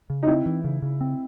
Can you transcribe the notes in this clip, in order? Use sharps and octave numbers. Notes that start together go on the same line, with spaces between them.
C#3
D#4
C4 E4
E3
C#3
C#3
C4